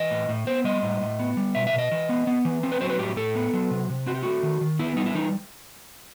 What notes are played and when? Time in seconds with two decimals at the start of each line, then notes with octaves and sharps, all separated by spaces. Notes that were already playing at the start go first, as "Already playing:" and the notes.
Already playing: E3 D#5
0.11 A2
0.29 A2
0.47 B3 C5
0.64 G3 D#5
0.82 A2
1.01 A2
1.19 B3
1.37 G3
1.55 B2 E5
1.67 E5
1.73 B2
1.78 D#5
1.91 E3
2.09 B3
2.27 B3
2.45 E3
2.63 C4
2.72 B4
2.81 F#3 C5
2.90 B4
2.99 A2 G4
3.16 A2 A4
3.35 B3
3.54 F#3
3.71 C3
3.90 C3
4.06 C4 F#4
4.15 G4
4.23 A3 F#4
4.43 D#3
4.61 D#3
4.79 B3 E4
4.96 G3 D#4
5.06 E4
5.15 E3 D#4